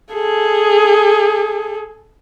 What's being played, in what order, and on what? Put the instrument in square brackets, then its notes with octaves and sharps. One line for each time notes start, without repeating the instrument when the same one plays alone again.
[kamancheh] G#4 A4